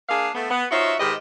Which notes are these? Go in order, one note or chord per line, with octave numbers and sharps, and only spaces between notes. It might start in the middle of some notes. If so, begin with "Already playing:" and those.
A#3 D4 G#4 D5 F5
A3 B3
B3
D#4 F4 F#4 C5 C#5 E5
G#2 D#3 G4 B4 D#5